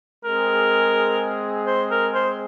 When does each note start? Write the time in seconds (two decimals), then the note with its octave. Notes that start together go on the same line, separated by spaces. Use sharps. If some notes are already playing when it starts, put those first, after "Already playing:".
0.25 G#3 C4 G#4 A#4
1.67 C5
1.91 A#4
2.14 C5